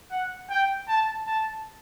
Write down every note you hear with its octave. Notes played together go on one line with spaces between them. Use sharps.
F#5
G5
A5
A5